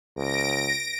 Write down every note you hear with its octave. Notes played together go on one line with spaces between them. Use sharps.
C#2 A#6 D7